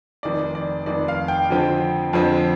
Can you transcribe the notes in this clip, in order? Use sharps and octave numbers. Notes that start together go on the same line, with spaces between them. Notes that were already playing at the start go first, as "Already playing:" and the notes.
F1 F2 D#3 D5
D5
F1 F2 D#3 D5
F5
G5
F2 D3 F3 C4
F2 D3 F3 C4